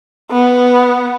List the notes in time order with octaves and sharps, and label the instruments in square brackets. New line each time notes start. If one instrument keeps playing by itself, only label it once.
[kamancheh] B3